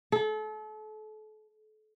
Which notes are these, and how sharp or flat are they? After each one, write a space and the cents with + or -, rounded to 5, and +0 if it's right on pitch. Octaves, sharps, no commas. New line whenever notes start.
A4 -35